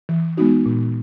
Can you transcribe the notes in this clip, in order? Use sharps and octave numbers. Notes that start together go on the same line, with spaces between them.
E3
G#3 B3 D#4 F#4
A#2